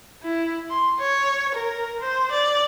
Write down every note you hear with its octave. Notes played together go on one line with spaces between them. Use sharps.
E4
C6
C#5
A#4
C5
D5